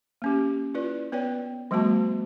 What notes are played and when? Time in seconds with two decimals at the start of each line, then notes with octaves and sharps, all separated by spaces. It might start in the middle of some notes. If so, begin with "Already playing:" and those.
0.22 A#3 C#4 G4
0.74 E4 F4 B4 D5
1.12 B3 B4 C#5 D5 G5
1.71 F3 G3 A3 B3 F#4 A5